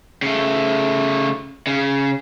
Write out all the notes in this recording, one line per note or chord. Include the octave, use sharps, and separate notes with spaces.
C#3 A3
C#3